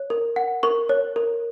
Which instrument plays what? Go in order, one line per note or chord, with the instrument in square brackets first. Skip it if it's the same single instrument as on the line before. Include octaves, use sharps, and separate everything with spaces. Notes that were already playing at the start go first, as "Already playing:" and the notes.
Already playing: [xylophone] C#5
A#4
F#5
A#4 C#6
C#5
A#4